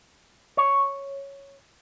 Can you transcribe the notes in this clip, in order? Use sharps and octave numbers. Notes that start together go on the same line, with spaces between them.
C#5